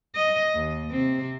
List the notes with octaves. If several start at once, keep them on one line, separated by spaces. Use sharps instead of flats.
D#5
D#2
C3 C4